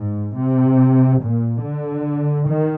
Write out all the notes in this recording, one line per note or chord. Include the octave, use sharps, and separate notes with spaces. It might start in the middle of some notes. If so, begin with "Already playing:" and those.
Already playing: G#2
C3
A#2
D3
D#3